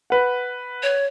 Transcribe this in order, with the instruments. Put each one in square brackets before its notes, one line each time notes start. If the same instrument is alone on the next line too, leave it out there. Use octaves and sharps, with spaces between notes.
[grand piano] B4 F#5
[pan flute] C#5